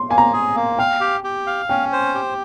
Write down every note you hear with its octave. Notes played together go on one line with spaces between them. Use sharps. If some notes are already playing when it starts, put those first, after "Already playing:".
Already playing: C6
A#3 G#5
A#5
G#4
A#3
F5 G5
G4
G4
F5
C#4 G5
C5
G4